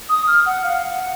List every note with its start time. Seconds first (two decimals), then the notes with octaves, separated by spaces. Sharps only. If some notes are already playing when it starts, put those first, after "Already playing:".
0.09 D#6
0.27 F6
0.46 F#5
0.64 F5
0.83 F#5